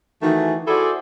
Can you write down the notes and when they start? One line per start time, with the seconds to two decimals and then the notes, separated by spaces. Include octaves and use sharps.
0.22 D#3 E3 A3 F#4 G#4
0.68 E4 F#4 G#4 A4 C5 D5